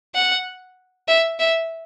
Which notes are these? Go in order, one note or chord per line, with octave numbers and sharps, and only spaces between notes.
F#5
E5
E5